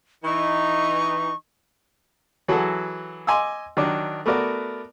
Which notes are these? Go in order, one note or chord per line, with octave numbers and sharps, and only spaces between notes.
E3 D#4 C#6
E3 F#3 F#4 G#4 A4
D#5 G#5 C6 D6 E6
D#3 F#3 D4
A3 B3 F#4 A#4 D5